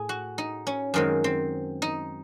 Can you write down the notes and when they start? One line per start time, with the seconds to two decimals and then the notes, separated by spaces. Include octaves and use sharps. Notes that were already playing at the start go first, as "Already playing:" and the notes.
Already playing: A2 G#4
0.09 F#4
0.38 D#4
0.67 C#4
0.94 F#2 D#3 G#3 C4
1.24 C4
1.82 D#4